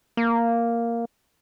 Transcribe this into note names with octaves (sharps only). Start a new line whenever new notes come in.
A#3